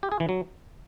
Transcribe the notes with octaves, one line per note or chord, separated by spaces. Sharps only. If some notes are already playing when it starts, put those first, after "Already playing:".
G4
G#4
E3
F#3